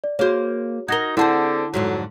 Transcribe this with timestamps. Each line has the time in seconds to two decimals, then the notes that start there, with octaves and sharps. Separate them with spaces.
0.04 D5
0.19 A#3 F#4 G#4 C5 C#5
0.88 D#4 F#4 A#4 G#6 A#6 G7
1.17 D3 C4 E4 G#4 C5 F#5 A5
1.74 F2 G#2 D3 F#3